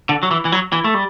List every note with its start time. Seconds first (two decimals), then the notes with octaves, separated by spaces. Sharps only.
0.09 D3
0.23 F#3
0.31 E3
0.45 E3
0.52 F#3
0.72 E3
0.84 A3
0.94 G3